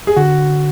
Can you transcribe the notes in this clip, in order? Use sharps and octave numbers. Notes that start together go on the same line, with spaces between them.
G#4
D3 F#4